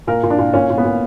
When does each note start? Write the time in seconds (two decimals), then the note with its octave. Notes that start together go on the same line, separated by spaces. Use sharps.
0.07 A#2 A#4
0.23 A#2
0.30 D4
0.39 A#2
0.54 A#2 C#4
0.70 A#2
0.78 B3
0.85 A#2